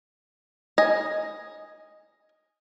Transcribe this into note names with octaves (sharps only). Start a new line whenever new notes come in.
D#5 G#5